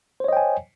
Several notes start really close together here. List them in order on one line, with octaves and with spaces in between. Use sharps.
C5 C#5 D#5 G5 G#5